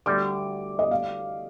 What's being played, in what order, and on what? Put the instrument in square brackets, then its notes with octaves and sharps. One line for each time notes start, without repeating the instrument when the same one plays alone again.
[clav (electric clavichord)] D2 D3 G3 [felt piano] D6
[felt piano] D#5
F5